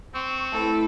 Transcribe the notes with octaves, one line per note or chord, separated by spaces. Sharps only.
C4 C#6
A2 A4 B4